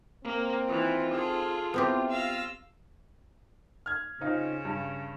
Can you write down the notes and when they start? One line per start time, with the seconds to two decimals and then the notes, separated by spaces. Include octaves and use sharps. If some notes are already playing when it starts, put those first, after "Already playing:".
0.24 A#3 C4
0.67 D#3 E3 F4
1.14 G#4 A4
1.74 B3 C4 E4 G4
2.10 F4 F5 E6 A#6
3.86 F6 G#6
4.21 C#3 C4 D#4 F4
4.65 G2